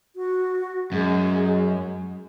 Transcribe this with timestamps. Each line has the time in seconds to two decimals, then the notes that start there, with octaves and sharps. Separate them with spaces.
0.16 F#4
0.92 F#2 G#3